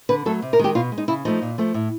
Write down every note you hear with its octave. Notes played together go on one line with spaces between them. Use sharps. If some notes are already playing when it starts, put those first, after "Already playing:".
D3 B4
F#3 A3 A4
C3
A#4
D#3 G#3 G4
B2 F4
G#3
D#4
C#3 E4
F3 A3 D#4
A#2
F3 A3
A2